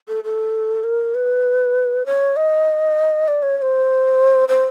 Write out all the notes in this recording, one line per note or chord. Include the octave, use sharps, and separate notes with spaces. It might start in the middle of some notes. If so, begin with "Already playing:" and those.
A4
A4
A#4
B4
C#5
D#5
D5
C#5
C#5
C5
C5